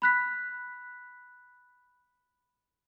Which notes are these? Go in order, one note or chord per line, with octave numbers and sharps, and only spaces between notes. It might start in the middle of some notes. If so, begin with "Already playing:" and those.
B5 F#6 B6